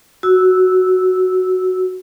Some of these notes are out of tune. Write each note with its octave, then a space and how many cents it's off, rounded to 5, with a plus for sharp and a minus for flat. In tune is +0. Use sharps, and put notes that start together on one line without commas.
F#4 +0 E6 -10